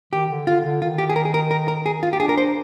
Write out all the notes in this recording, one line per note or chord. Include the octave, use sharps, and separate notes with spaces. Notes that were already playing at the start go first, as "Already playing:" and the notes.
D#3 G4
D3
D3 F4
D3
D#3 F4
G4
G#4
A#4
G#4
A#4
A#4
A#4
G#4
F4
G4
D4 G#4
A#4
C5